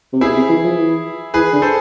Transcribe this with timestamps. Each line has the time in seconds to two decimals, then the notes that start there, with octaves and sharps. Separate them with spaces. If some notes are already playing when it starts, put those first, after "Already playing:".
0.13 C3
0.21 B2 E4 G#4
0.35 C3
0.49 E3
0.64 F3
0.78 E3
1.34 E3 G#4 B4
1.53 D3
1.62 A4 C5